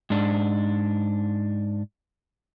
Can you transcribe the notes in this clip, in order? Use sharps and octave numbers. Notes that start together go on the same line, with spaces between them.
G#2 D4